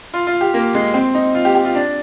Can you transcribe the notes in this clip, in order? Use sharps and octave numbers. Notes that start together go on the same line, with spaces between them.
F4
F4
G4
A#3
G#3
C4
D#4
F4
G4
G4
F4
D4